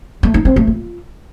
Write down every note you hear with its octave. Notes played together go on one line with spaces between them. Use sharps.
A3
D#4
C4
A3
F4